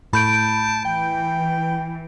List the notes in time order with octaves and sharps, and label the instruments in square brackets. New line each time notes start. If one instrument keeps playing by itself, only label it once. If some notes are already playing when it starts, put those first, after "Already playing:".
[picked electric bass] A2 [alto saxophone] A5 [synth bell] B5 G6 D7
[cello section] E3 [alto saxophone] G5